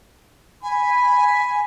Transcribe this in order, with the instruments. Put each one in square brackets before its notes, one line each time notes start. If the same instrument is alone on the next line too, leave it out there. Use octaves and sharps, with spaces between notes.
[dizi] G#5 [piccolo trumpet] B5